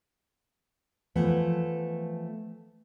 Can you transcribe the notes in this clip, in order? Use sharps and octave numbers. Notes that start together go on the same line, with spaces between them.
E3 F3 A3 B3